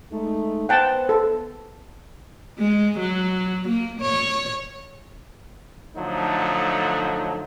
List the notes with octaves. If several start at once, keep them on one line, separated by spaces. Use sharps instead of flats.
G#3 A3 D#4
B3 C5 F#5 G5 A5
A4
G#3
F#3
A#3
C#5
D3 F3 F#3 A3 D#4